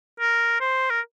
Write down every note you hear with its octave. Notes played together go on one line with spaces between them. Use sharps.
A#4
C5
A#4